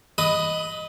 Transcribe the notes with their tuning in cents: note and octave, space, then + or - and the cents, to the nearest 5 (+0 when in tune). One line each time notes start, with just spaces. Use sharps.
B4 +5 D#5 +0 D#6 +30